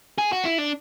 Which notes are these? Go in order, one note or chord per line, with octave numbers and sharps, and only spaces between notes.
G#4
F#4
E4
D4